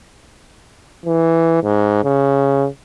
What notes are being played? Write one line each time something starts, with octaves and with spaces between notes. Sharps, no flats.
E3
G#2
C#3